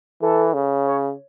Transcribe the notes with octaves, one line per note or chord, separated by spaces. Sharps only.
E3 A4
C#3
C#5